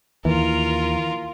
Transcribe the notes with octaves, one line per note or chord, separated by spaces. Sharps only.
D#2 E3 F4 A#4